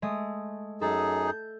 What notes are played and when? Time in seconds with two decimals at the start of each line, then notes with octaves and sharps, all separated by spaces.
0.02 G#3 A3 D#6
0.81 F#2 D#4 G#4 A4
1.27 G6